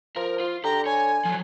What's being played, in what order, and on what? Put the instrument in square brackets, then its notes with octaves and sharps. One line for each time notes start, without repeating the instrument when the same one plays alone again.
[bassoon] F3 [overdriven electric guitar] A#4
[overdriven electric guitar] F4
[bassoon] D3 [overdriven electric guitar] G4 G5 [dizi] A#5
[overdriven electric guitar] C#5 [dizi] G#5
[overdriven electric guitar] F3 F#3